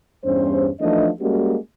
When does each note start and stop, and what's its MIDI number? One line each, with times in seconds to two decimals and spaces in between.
0.24 0.69 40
0.24 0.69 43
0.24 0.69 55
0.24 0.69 61
0.24 0.69 72
0.80 1.09 52
0.80 1.09 53
0.80 1.09 57
0.80 1.09 62
0.80 1.09 63
0.80 1.09 75
1.20 1.56 55
1.20 1.56 56
1.20 1.56 58
1.20 1.56 61
1.20 1.56 66
1.20 1.56 67